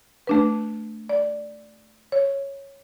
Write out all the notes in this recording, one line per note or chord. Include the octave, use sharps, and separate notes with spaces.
A3 D4 B4
D5
C#5